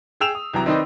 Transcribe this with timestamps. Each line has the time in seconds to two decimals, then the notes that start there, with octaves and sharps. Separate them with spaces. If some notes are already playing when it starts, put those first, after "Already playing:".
0.20 G#4 G5 E6 E7 F7
0.35 D#6
0.53 C2 E3 F#3 G5 A#5
0.66 D#3 C4 D#4 B4 D5 D#5